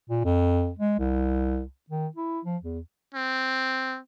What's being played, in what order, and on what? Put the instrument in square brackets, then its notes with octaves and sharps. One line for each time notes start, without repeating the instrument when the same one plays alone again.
[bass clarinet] A#2
F2
G#3
C2
D#3
E4
F3
E2
[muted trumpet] C4